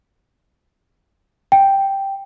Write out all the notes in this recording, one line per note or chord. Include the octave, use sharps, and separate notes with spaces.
G5